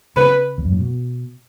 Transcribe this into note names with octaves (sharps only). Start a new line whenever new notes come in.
C#3 B4
E2
F#2
A2
B2